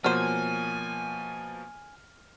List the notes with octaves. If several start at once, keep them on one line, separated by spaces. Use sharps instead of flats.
B2 F3 F#3 A#3 C5 G#5 F6 D#7